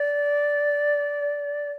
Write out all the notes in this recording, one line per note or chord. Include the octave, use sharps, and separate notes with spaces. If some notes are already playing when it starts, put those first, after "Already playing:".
Already playing: D5